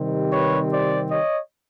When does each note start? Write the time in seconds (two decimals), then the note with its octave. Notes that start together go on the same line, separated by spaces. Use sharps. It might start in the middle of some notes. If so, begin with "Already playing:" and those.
Already playing: C3 D#3 G3 C4
0.32 B4 C#5
0.72 C5 D5
1.11 C#5 D#5